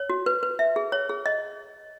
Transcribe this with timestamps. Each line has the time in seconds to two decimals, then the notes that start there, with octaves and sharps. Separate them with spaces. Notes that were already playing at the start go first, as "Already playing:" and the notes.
Already playing: C#5
0.10 F#4
0.26 B4
0.43 B4
0.59 E5
0.76 G#4
0.92 C#5
1.09 G#4
1.26 D#5